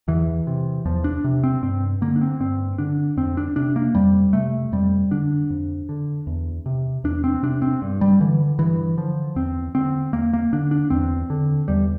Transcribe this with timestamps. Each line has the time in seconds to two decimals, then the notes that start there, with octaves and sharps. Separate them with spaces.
0.08 E2 E3
0.47 C3
0.85 E2 F3
1.04 D4
1.24 C3
1.43 C4
1.62 G2 C4
2.01 D3 A#3
2.16 D4
2.21 C4
2.40 G2 C4
2.78 D3 D4
3.17 F2 C4
3.37 D4
3.56 C3 D4
3.76 A#3
3.95 F2 G3
4.33 C3 A3
4.72 F2 G3
5.11 D3 D4
5.50 F2
5.89 D3
6.27 E2
6.66 C3
7.04 E2 D4
7.24 C4
7.43 C3 D4
7.62 C4
7.82 G2
8.01 G3
8.20 D3 E3
8.59 G2 E3
8.97 D3 F3
9.36 E2 C4
9.75 D3 C4
10.13 E2 A#3
10.33 A#3
10.53 D3 D4
10.71 D4
10.90 E2 C4
11.30 D3
11.68 E2 G3